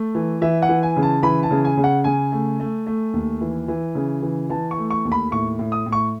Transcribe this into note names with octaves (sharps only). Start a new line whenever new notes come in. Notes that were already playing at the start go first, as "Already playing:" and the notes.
Already playing: A3
E3
E3 E5
F#5
E3
G#5
C#3
A5
E3 B5
A5
C#3
G#5
C#3
F#5
C#3 G#5
A3
A3
A3
D#2
E3
E3
C#3
E3
E3 A5
C#6
A3
C#6
D#2
B5
A2 C#6
A2
D#6
A2
C#6